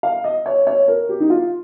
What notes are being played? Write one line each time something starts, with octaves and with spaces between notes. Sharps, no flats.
F5
D#5
C#5
C#5
A#4
G4
D#4
F4